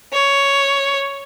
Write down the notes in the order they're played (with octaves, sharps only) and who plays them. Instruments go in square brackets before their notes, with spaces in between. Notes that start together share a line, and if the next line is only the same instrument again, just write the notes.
[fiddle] C#5